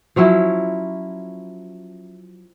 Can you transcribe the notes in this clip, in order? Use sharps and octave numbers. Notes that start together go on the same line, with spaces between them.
F3 F#3 C#4 E4